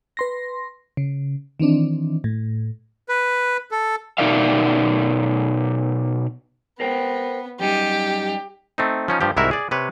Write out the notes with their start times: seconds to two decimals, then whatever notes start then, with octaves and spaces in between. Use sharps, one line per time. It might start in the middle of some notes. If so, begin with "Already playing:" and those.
0.17 B4 C6 A#6
0.97 C#3
1.60 D#3 E3 C4 D4
2.24 A2
3.09 B4
3.71 A4
4.18 B2 D#4 A#4 D5 E5 F5
6.80 B3 A#4 C5 G5
7.60 F#2 G3 D#4 G4
8.78 A3 C4 D#4
9.08 F3 C#4 D#4
9.21 G2 F3 G4
9.37 C2 G#2 E4 F#4 A#4 E5
9.51 G#4 D5
9.71 C3 B4 C#5